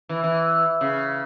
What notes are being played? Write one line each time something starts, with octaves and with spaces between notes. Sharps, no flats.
E3
E3
C#3